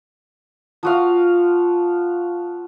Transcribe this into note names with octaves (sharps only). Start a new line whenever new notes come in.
F3 F#4 F5